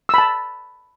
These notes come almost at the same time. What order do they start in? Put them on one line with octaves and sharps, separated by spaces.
E6 B5 A5